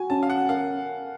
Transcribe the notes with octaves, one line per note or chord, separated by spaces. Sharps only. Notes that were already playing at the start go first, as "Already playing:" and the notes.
Already playing: F#4 G#5
C#4 A5
F5
F#5
A#4 F5